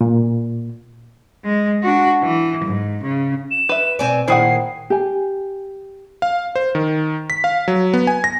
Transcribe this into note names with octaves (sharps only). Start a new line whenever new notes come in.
A#2
G#3
D4 F#4
E3
G#2
C#3
E7
B4 E5
B2 C4 D5 G#5
A#2 D#3 E4 G#4 C5 F#5 G5 C7
G4 G#5
F5
C5
D#3
B6
F5
F#3
B3
G#5
A#6